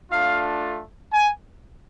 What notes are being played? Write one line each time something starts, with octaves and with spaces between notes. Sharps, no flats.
A3 D4 F4 F5
G#5